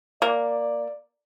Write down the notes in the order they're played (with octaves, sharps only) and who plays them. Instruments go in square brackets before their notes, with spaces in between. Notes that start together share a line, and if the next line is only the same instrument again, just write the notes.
[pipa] A#3 [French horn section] D5